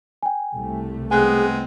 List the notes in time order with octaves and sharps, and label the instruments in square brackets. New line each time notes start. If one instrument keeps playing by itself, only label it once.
[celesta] G5 G#5
[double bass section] C2 A3
[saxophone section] G#3 B3 C4 [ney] G#4 [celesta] G#5 F#6